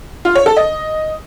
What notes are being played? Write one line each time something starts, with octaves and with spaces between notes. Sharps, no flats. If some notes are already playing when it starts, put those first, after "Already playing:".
F4
C#5
A4
D#5